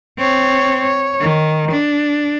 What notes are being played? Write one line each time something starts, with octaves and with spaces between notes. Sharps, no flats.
C4 C#5
C#5
D#3
D4